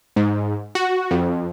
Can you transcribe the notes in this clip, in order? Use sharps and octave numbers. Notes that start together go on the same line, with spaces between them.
G#2
F#4
F2